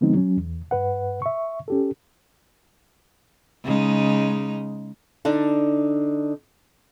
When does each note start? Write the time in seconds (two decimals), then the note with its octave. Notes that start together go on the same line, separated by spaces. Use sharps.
0.01 D3 F3 G#3 B3 C4 D#4
0.14 F#3 C#4
0.37 E2
0.71 G2 B4 F#5
1.22 E5 C#6
1.68 C#4 G4 A4
3.64 C#3 G#3 D#4
5.25 D3 D4 D#4